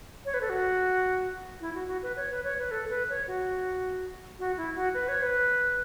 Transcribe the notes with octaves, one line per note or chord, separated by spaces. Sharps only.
C#5
B4
A4
F#4
E4
F#4
F#4
B4
C#5
B4
C#5
B4
A4
B4
C#5
F#4
F#4
E4
F#4
B4
C#5
B4